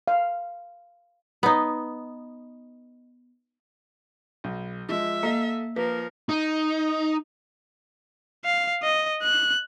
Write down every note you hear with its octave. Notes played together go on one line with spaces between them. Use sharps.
F5
B3 D#4
B1
F3 G#3 E5
A#3 A4 D#5 F5
F3 A#3 A#4 B4
D#4
F5
D#5
F#6